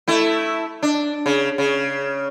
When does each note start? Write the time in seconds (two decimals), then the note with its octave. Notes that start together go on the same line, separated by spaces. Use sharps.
0.08 A3 E4
0.83 D4
1.26 C#3
1.58 C#3